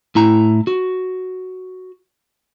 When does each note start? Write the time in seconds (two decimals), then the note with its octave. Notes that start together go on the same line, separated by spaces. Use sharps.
0.15 A2 E4 A#5
0.67 F#4